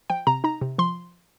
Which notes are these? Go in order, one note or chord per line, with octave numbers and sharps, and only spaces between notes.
F3 G5
C3 A#5
D#4 A#5
C3
F3 C6